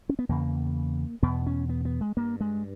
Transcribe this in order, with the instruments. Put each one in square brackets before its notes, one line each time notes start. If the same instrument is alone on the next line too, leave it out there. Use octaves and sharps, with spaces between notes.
[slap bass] C#4
B3
E2 C#3 A#3
E2 B2 B3
C#4
B3
B3
G#3
G2 A#3
G#3